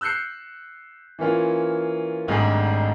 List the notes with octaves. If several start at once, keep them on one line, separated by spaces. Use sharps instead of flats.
E6 F#6 G6 C7 C#7
E3 A#3 C#4 F4
G#1 G#2 G3 A3 D4 G#4